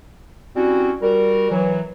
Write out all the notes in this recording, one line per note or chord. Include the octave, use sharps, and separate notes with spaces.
G3 C4 C#4 E4 F#4
G3 F#4 A#4
E3 F#3